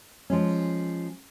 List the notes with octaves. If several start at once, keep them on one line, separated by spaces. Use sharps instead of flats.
F3 G#3 C#4